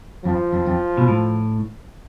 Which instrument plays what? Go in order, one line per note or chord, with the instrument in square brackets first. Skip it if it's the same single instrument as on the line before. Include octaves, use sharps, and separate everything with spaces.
[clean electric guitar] F2 [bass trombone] F3
[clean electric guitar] F2
F2
B2
A2